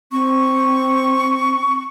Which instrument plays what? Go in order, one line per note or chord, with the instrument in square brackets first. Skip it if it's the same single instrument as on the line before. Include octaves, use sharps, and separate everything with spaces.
[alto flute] C4 [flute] C#6